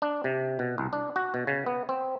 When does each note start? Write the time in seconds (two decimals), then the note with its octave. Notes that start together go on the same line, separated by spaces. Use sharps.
0.02 D4
0.24 C3
0.59 B2
0.78 C2
0.93 D4
1.16 F#4
1.34 B2
1.47 C#3
1.66 B3
1.89 C4